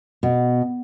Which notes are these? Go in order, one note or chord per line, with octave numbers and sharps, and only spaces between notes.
B2